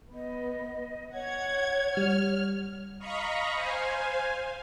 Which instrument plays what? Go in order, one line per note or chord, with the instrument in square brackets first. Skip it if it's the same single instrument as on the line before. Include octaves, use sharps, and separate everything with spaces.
[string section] B3 [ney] D#5
[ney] C#5 [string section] F#5 G#6
[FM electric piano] G3 [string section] F6
[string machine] D#5 F5 A#5 B5 C#6
C5 F5 G#5